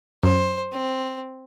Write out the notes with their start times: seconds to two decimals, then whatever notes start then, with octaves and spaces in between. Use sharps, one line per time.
0.23 F#2 C5
0.72 C4